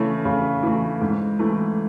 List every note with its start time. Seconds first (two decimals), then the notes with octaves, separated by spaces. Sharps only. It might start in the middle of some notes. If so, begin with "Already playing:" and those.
Already playing: C#3 E3 A3
0.25 C#3
0.63 E3 A3
1.01 G#2
1.39 E3 A3